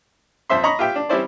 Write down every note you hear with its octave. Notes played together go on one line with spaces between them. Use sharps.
F2 C5 E5 C6
D#5 A#5 B5 C#6
F4 G4 E5 G5
D4
G3 C4 C#4 E4 C5 D5